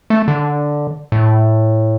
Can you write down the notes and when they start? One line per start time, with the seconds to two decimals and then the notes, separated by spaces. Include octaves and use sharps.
0.10 A3
0.28 D3
1.12 A2